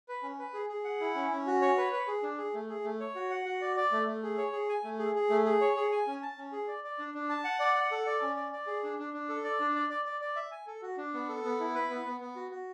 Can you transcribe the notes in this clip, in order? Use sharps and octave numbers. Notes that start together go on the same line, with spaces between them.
B4
C#4
B4
G#4
G#4
F#5
E4
C#4
C#4
F#4
C#5
B4
B4
G#4
D4
G#4
A3
G#4
A3
C#5
F#4
F#5
F#4
D5
D5
A3
A3
G#4
C#5
G#4
G#5
A3
G#4
G#4
A3
G#4
C#5
G#4
G#5
C#4
A5
C#4
G#4
D5
D5
D4
D4
A5
F#5
D5
F#5
A4
D5
C#4
D5
D5
G#4
D4
D4
D4
A4
D5
D4
D5
D5
D5
D5
E5
G#5
A4
F#4
D4
B3
A4
B3
E4
B4
B3
B3
B3
F#4
F#4